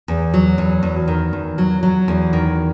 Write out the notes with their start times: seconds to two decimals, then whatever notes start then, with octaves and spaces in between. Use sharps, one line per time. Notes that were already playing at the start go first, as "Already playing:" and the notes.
0.08 E2
0.34 F#3
0.58 E2
0.83 E2
1.08 D#3
1.33 E2
1.58 F#3
1.83 F#3
2.08 E2
2.33 D#3